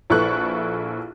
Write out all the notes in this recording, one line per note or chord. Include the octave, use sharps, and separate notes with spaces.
A#1 E4 A4 B4 C#6 F#6